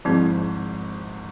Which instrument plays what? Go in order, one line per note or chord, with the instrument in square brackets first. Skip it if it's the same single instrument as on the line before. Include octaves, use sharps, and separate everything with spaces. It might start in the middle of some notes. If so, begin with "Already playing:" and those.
[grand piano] G#1 G#2 [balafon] F3 G#3 C4 E4 G#4